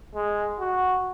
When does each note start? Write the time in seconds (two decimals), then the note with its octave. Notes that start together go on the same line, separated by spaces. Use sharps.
0.15 G#3
0.60 F#4